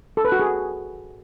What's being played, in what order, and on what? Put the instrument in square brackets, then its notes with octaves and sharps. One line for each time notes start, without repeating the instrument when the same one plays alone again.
[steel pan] A4
B4
F#4
G#4